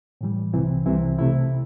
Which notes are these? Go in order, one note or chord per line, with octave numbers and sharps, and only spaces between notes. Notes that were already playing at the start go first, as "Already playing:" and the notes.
A2 E3 G3
C2 C3 E3 C4 E4
C2 C3 E3 C4 E4
C3 A3 E4